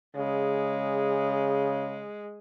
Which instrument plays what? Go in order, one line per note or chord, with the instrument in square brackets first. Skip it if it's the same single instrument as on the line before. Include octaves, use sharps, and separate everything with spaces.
[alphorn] C#3 [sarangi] G#3